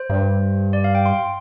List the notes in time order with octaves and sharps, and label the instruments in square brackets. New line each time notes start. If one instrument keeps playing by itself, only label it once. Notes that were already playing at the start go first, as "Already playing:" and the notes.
Already playing: [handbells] C5
[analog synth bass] G2
[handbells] D5
F5
G5
C6